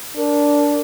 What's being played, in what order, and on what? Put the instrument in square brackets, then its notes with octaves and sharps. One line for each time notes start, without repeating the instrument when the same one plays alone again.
[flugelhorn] D4 [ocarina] A#4